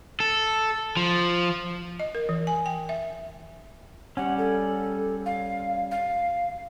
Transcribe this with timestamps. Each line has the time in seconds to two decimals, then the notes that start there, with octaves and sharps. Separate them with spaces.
0.20 A4
0.97 F3
2.00 D#5
2.15 A#4
2.29 E3
2.47 G#5
2.66 G5
2.89 E5
4.17 G3 C#4 F#5
4.38 A4
5.26 F5
5.91 F5